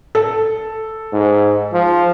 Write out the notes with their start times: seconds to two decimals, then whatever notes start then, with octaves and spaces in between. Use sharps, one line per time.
0.15 A4
1.12 G#2
1.73 F3